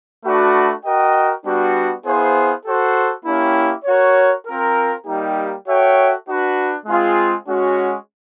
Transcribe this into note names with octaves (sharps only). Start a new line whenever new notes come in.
A3 D4 F#4 B4 D5
F#4 A#4 D#5 G5
G3 B3 D4 F#4
B3 E4 G#4 C5 F5
F#4 A4 C5
A#3 C#4 E4 G4
F#4 A#4 C#5
C4 F4 A#4
G3 A#3 D#4 G4
F#4 A4 C#5 E5 G5
D4 F#4 B4
G#3 C4 F4 G#4
G#3 C#4 F#4